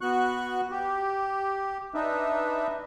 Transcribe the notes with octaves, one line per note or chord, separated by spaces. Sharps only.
B3 F#4 C#6 F#6
G4
D4 D#4 B4 E5